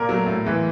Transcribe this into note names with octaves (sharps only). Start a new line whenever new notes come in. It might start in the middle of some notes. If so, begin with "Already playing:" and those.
Already playing: A#2 A#4
F#3 A3
A2
E3 G#3